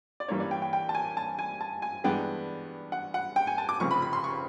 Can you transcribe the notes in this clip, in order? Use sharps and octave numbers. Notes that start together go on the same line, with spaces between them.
D5
G2 E3 G3 A#3 C#4 C#5
D5
G5
G5
G5
A5
G#5
A5
G#5
A5
G#5
G2 E3 G#3 B3 D4 G5
F#5
F#5
G5
G#5
A5
D6
F1 F2 C#3 C#6
B5
B5
C6
C#6